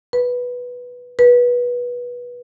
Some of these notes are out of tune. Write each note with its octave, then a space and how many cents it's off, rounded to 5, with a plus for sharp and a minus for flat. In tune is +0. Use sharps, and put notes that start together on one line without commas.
B4 -5
B4 -20